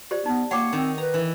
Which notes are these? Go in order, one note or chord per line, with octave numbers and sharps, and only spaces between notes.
G4 C5 D5
B3 D#4
A#3 C#5 F#5 G5 D6
D#3 C4
B4 A#5
E3